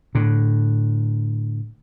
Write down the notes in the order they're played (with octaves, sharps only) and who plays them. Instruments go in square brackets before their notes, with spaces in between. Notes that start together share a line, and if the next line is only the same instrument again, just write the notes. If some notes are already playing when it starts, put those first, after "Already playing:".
[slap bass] A2 D3